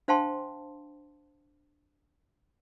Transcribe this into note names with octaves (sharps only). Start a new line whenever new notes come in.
D4 C5 F5 G5 A5 C6